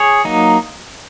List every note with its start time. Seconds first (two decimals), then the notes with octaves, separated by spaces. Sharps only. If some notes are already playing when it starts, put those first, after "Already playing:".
Already playing: G#4 C#5
0.25 F#3 A#3 D#4